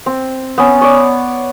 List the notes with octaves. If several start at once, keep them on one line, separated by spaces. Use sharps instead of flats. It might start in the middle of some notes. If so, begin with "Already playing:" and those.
C4
B3 C#4
C#5 D5